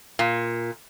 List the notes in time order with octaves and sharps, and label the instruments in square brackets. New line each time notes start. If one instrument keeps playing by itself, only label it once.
[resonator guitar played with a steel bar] A#2